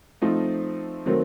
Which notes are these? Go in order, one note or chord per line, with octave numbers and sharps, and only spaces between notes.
F3 A3 C4 D#4
D#3 F#3 A3 C4